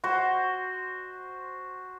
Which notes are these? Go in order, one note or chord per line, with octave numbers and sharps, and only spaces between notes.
F#4 C5